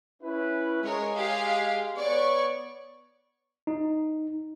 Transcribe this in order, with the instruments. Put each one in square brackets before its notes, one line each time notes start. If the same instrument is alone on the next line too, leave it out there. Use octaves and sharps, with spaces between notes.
[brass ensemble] C#4 E4 B4
[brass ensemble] G#3 [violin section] A#4 C#5
[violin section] G4 G#4 F5
[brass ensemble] B3 C#5 [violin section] D5 C#6
[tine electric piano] D#4